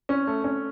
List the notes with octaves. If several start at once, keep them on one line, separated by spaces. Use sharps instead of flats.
C#4
A3
C#4